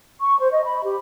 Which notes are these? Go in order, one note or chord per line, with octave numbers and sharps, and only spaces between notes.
C#6
C5
D#5
B5
G4